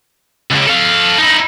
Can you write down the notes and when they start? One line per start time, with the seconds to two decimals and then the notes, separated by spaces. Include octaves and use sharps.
0.51 C#2 C#3
0.67 A4 F5
1.19 D#4 E4